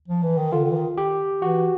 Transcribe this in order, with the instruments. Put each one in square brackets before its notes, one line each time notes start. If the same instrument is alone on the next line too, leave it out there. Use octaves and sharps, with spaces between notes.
[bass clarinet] F3
E3
D#3
[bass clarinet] D3 [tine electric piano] F4
[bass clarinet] D3
E3
D#3
[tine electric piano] G4
[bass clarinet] E3 [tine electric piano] F#4